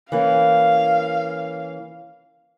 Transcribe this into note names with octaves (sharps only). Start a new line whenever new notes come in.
E3 A#3 C#4 F5